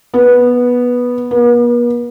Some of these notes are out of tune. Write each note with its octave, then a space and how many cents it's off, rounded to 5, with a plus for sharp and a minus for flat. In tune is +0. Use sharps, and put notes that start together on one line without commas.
B3 -10
B3 -45